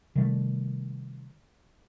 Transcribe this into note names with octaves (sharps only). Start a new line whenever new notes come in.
C3 D#3 G3 A3